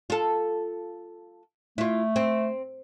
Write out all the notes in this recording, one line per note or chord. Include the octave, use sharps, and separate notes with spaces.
F4 A4
A3 E4 F4
C4